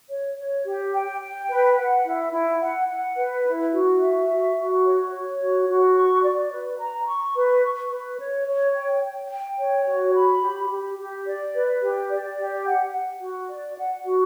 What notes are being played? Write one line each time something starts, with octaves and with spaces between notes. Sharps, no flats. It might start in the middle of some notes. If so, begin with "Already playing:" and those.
C#5
C#5
G4
G5
G5
B4
F#5
E4
E4
F#5
F#5
B4
E4
F#4
E5
F#4
F#4
C#5
C#5
F#4
F#4
C#6
D5
B4
A#5
C#6
B4
C#6
B4
C#5
C#5
G5
G5
G5
C#5
F#4
B5
G4
G4
G4
D5
B4
G4
D5
G4
F#5
F#5
F#4
D5
F#5
F#4